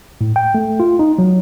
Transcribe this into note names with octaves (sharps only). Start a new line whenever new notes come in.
A2
G5
A3
F4
D#4
F#3